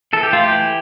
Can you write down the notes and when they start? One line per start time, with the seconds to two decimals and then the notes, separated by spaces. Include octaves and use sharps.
0.13 E3 A4
0.23 G4
0.33 A3 F4
0.44 G4
0.52 E3